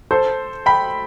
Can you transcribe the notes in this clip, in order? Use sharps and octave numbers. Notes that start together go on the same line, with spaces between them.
A4 C5
G5 B5